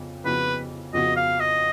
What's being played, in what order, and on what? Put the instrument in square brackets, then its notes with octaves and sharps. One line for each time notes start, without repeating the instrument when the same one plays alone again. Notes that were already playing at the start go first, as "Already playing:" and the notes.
Already playing: [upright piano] F2 C#3 B3
[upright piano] F2 C#3 F3 B3 F#4 [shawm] B4
[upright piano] F2 C#3 F3 B3 F#4 [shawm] D#5
[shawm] F5
D#5